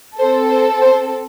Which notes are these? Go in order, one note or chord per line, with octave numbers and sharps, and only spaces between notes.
C4 A4 C5
C5
C5